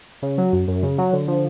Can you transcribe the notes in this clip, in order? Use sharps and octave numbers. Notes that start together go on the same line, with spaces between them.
C#3
F#3
F#2
F#2
C#3
F#3
D3
F3